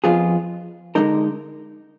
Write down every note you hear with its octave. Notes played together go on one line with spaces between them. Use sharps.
F2 F3 B3 F4 G#4
D3 F3 G#3 D#4 A#4